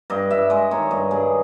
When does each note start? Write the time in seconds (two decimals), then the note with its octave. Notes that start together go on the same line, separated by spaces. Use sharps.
0.10 G2 D#5
0.30 G2 E5
0.50 G#3 D#5
0.71 D#3 C#5
0.91 G2 D#5
1.11 G2 G#4